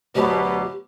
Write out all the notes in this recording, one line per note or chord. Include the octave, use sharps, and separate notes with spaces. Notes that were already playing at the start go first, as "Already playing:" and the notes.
D2 B2 F#3 G4